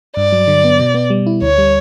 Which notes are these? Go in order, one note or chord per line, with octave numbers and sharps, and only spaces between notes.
G2 D5
F#3
D3
B3
B2
B3
G3
E4
D2 C#5
G3